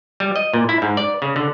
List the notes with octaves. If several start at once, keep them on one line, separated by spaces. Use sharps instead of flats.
G3
D#5
A#2
E4
G#2
D5
C#3
D3